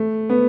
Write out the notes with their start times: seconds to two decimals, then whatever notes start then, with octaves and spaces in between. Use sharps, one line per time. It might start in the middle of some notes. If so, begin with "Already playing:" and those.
Already playing: A3
0.30 B3